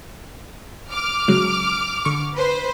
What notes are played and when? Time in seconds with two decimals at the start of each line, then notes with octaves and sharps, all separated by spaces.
0.90 D6 F6
1.28 C#3 F#3 G#3
2.05 D3 C#6
2.35 B4 C5